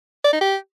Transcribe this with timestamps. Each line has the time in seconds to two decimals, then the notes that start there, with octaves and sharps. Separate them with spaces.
0.24 D5
0.33 D#4
0.41 G4